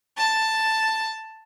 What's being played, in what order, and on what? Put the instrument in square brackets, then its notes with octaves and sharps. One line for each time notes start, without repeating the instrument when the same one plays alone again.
[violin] A5